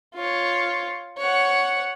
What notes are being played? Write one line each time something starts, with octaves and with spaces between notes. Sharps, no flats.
F4 C#5
C#5 F#5